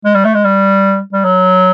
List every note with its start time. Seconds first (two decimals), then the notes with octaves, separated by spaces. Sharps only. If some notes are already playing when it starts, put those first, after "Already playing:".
0.05 G#3
0.15 G3
0.25 A3
0.35 G#3
0.44 G3
1.13 G3
1.25 F#3